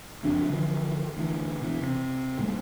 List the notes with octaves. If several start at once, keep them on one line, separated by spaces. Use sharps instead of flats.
F#1 F2 F#3 D4
D3 E3 F3
D2 E3
B2 E3
C3
A#2 G3 A3